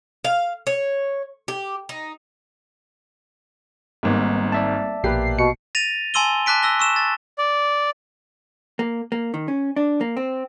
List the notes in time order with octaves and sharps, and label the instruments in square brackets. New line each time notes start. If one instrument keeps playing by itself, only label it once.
[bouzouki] F5
C#5
G4
D#4
[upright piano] G#1 G#2 [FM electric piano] G3 A#3 B3
[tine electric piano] D5 E5 A5
[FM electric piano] A#1 B2 C7 [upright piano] A#3 G4 B4
[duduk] B2 [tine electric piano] C#7
[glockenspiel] A6 A#6 D#7 F7
G#5 A5 C6 E6 D#7 G7
A5 D6 F#6 B6 D7
E6 A#6 G7
C#6 E6 E7
A6
[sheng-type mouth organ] D5
[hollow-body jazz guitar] A#3
A#3
D#3
C#4
D4
A#3
C4